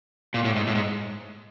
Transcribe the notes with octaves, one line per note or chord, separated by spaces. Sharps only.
A#2
A2
G#2
A2
G#2